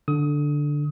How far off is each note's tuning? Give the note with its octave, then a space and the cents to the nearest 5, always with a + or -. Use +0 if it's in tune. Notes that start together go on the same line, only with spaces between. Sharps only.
D3 +0 D#6 +25